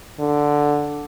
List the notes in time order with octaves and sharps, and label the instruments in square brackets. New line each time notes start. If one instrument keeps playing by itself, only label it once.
[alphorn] D3